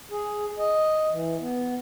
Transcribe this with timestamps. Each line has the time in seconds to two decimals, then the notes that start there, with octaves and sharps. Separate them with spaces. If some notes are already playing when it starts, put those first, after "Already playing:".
0.11 G#4
0.58 D#5
1.12 E3
1.40 B3